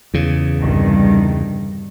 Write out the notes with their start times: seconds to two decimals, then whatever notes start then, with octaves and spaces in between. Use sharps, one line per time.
0.14 E2 C#3
0.58 C2 G2 D#3